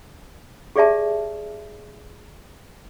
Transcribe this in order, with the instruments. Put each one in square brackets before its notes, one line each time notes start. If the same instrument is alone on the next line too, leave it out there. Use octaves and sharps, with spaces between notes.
[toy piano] G4 G#4 D5 E5 A5